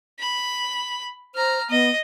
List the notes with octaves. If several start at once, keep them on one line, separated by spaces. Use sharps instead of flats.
B5
C5 A#5 F6
B3 D#5